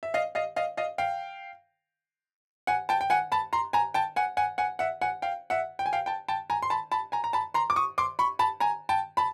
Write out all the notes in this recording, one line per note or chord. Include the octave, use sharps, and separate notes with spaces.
E5
D#5 F5
D#5 F5
D#5 F5
D#5 F5
F5 G5
F#5 G#5
G5 A5
G5
F#5 G#5
A5 B5
A#5 C6
G#5 A#5
G5 A5
F#5 G#5
F#5 G#5
F#5 G#5
E5 F#5
F#5 G#5
F5 G5
E5 F#5
G5
G#5
F5 G5
G5 A5
G5 A5
G#5 A#5
C6
A5 B5
A5 B5
G#5 A#5
A#5
A5 B5
A#5 C6
D6
C#6 D#6
C6 D6
B5 C#6
A5 B5
G#5 A#5
G5 A5
A5 B5